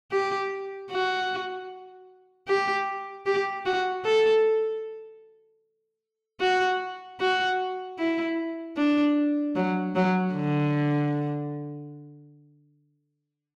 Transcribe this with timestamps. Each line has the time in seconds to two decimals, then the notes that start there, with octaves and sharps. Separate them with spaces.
0.11 G4
0.90 F#4
2.48 G4
3.26 G4
3.65 F#4
4.05 A4
6.40 F#4
7.20 F#4
7.98 E4
8.77 D4
9.56 F#3
9.96 F#3
10.34 D3